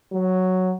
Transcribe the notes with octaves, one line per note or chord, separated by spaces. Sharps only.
F#3